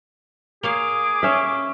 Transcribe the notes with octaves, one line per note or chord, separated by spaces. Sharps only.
A#3 G#4 C#5 F5 D6
C#4 E5